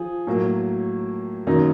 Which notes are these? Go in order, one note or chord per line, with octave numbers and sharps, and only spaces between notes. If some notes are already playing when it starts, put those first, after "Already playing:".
Already playing: F3 G#4
A2 F#3 A#3
F#2 D#3 F#3 A#3 D#4